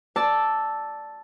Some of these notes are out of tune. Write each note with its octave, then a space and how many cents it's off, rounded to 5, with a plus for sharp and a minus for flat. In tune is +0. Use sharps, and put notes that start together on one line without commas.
D5 +0 A5 +0 E6 +0